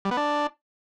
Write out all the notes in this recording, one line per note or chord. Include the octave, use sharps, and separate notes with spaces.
G3
B3
D4